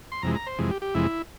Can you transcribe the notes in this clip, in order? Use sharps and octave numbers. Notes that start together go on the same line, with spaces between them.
C6
F2 C3 E3 G#3 A#5
A#5
C5
F2 C3 E3 G#3
G4
G4
F2 C3 E3 G#3 E4